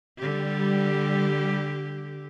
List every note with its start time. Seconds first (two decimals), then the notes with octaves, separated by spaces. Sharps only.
0.18 D3 G3 G4